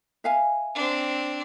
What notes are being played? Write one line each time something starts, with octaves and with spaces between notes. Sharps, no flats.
E5 F5 G#5
C4 D4